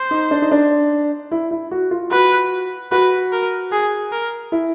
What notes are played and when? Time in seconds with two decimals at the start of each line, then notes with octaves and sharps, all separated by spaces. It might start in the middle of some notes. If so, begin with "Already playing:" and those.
Already playing: C5
0.11 D#4
0.31 D4
0.42 D#4
0.51 D4
1.31 E4
1.51 E4
1.71 F#4
1.91 F4
2.11 F#4 B4
2.92 F#4 B4
3.32 A#4
3.72 G#4
4.12 A#4
4.52 E4